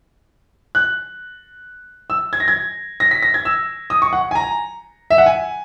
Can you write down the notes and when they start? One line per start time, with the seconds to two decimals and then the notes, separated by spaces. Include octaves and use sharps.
0.75 F#6
2.10 E6
2.33 G#6
2.40 A#6
2.48 G#6
3.00 A#6
3.11 B6
3.23 A#6
3.34 G#6
3.45 E6
3.90 D#6
4.02 C#6
4.13 F#5
4.31 G#5
4.35 A#5
5.10 E5
5.18 F#5
5.26 G#5